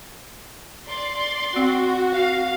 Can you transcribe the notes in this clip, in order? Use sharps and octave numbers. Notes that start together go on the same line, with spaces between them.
D5 C6
C4 F#4
F5